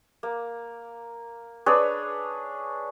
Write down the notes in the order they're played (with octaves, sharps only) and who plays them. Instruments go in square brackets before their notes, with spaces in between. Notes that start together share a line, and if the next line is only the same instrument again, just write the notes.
[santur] A#3
D4 G#4 B4 C#5